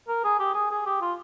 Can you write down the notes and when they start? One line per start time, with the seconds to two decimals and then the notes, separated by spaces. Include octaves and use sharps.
0.08 A#4
0.24 G#4
0.39 G4
0.54 G#4
0.71 G#4
0.86 G4
1.01 F4